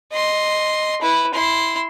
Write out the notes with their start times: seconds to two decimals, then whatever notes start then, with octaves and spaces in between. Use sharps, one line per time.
0.13 D#5 C6
1.02 E4 B4
1.34 E4 C6